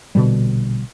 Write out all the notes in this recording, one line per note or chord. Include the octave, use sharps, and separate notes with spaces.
A#1 B2 D3 G3